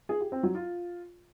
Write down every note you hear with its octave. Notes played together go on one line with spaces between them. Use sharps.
G#4
G4
C4
F#3
F4